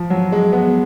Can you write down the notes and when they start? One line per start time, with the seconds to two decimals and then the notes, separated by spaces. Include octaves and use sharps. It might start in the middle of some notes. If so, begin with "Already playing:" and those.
Already playing: F3
0.10 F#3
0.32 G#3
0.53 B3